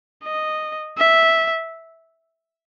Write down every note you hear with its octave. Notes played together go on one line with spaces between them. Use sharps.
D#5
E5